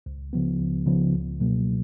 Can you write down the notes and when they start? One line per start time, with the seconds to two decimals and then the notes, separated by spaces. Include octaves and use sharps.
0.06 C#2
0.33 C#3 F3 B3
0.60 C#2
0.86 C#3 F3 B3
1.14 C#2
1.40 B2 F#3 A#3